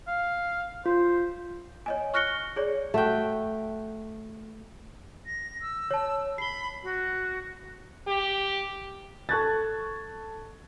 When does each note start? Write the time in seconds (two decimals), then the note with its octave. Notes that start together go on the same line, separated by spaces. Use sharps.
0.08 F5
0.86 F4 C5
1.86 C#5 D#5 G#5
2.14 C#6 F6 F#6 A#6 C#7 G7
2.56 G#4 C#5 D5
2.94 A3 F#4 G5
5.26 A#6
5.61 E6
5.91 C#5 A5
6.38 B5 C7 G7
6.83 F#4
8.07 G4
9.29 A4 A5 C#6 F#6 G#6 A6